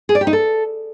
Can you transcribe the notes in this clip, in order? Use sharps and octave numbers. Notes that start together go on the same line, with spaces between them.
G#4
D5
G4
D#4
A4